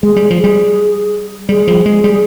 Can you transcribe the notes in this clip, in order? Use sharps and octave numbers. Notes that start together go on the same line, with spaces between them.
G#3 G#4
G3
F3
G3 G#4
G3 G#4
F3
G#3
G3